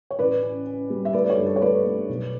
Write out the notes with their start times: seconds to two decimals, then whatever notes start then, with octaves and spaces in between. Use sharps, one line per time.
0.11 C#5
0.19 A1 B4 D5
0.42 C#4
0.66 C#4
0.90 G3
1.05 E5
1.13 A3 B4 D5
1.24 D5
1.29 A4 C#5
1.37 G2
1.46 A4
1.56 C#5
1.61 A3 B4 D5
1.85 A3
2.09 B1